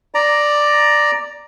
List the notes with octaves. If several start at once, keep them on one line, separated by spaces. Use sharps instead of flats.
D5 A#5